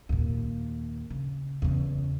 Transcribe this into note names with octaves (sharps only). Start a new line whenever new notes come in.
D#2 A#2
C#3
E2 C#3